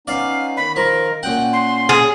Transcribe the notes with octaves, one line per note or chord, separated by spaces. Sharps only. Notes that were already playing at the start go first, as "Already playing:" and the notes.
B3 C#4 D#4 D5 F5
D#3 B5
F3 A#4
A#2 C#4 F#5 G5
C6
G#4